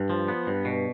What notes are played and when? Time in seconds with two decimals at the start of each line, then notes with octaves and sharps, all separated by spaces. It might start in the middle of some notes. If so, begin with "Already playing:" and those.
Already playing: G2
0.10 F3
0.28 B3
0.47 G2
0.65 B2